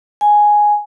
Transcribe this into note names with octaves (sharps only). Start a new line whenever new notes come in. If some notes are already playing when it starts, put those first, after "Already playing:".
G#5